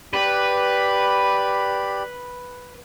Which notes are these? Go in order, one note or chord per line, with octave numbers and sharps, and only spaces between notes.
G4 B4 D5 B5